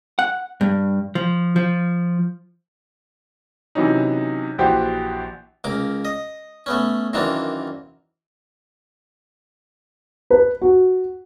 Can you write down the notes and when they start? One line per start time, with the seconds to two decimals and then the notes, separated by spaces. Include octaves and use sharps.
0.19 F#5
0.61 G2
1.15 F3
1.56 F3
3.75 C3 E3 F#3 C#4 D#4
4.58 A#1 E3 F#4 G4 C5 G5
5.64 C#2 A#3 D6
6.05 D#5
6.66 A3 B3 C#4
7.13 F#2 D#3 E3 A#3 C4 D4
10.30 B4
10.62 F#4